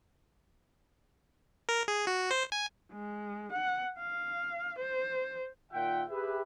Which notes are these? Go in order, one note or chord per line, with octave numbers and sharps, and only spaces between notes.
A#4
G#4
F#4
C5
G#5
G#3
F#5
F5
C5
A#2 D#3 F4 E5 F#5 G5
G4 G#4 B4 E5